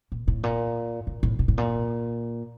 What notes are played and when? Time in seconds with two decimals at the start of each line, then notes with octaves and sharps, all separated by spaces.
0.12 A#2
0.28 A2
0.43 A#2
1.07 A2
1.23 A2
1.39 A#2
1.48 A2
1.58 A#2